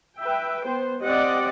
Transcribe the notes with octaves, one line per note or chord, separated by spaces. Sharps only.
B4 E5 G5
B3 C5
C4 G4 D5 D#5 F#5